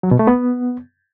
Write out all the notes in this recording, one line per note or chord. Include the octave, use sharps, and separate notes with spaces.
F#3
B2
A3
B3